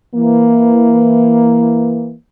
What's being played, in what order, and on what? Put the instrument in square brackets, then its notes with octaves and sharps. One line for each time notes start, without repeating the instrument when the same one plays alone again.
[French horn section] E3 A#3